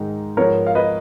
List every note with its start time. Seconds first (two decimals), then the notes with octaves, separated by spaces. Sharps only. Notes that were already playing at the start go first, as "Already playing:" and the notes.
Already playing: G#2 D#3 G#3 D#4
0.37 G#2 F3 B3 A#4 C#5
0.67 F5
0.75 B4 D#5